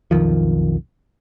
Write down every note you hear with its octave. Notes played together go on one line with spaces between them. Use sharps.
B1 F2 D#3 F3